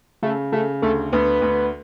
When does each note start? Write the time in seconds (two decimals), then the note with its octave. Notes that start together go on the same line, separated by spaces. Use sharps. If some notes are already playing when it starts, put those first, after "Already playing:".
0.23 C#3 A3
0.52 C#3 A3
0.82 D2 A3
1.13 D2 B3
1.42 D2